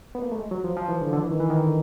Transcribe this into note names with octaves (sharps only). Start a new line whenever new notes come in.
B3
A#3
A3
G#3
F#3
F3
F3
E3
D3
D3
E3
D#3
E3
D#3
D3